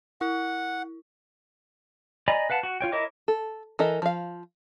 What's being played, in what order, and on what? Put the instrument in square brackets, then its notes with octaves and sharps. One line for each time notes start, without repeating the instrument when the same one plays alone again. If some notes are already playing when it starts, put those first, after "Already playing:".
[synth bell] E4 [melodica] F#5
[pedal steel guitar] D5 D#5 G#5 A#5 B5
B4 F5 F#5 A5
F#4
F4 C#5 G5
E4 A#4 C#5 D#5 D6
[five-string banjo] A4
E3 A4 A#4 D#5
F3 F5